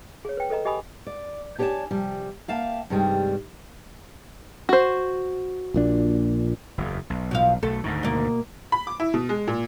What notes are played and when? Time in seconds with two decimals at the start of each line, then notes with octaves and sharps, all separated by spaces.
0.25 G#4 C#5
0.37 B4 G5
0.50 A4 B4 D#5 A#5
0.65 G4 D#5 G#5 B5 D#6
1.07 D5
1.58 D4 G4 C#5 D5 G#5 A5
1.91 C3 F3 G3
2.48 A#3 E5 F5 G5 A5
2.90 G2 C3 D#3 G3 G#3
4.69 F#4 C5
5.74 A#1 A#2 D4
6.78 F#1 E2
7.10 B1
7.31 B2 F3 F5
7.63 B1 A3 A4
7.84 D2 G#2 D#3
8.03 B2 A#3
8.72 B5
8.87 D6
9.00 E4
9.14 B2
9.29 G#3
9.47 A#2